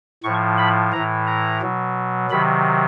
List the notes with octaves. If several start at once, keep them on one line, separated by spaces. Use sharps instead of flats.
A2 F3 C#6
B5
A2 E3 A#5
A#5
B2 F#3
C3 D#3 F#3 B5